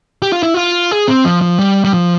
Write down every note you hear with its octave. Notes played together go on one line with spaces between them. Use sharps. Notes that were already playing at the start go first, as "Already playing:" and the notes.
G4
F4
E4
F4
G#4
C4
F3
F3
G3
G3
F3